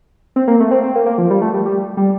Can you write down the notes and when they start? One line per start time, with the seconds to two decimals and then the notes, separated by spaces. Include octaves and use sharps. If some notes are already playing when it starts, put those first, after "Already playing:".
0.36 C4
0.48 A#3
0.60 A3
0.71 C4
0.83 C4
0.95 A#3
1.06 A#3
1.18 F3
1.30 G3
1.42 A3
1.54 G3
1.66 G3
1.97 G3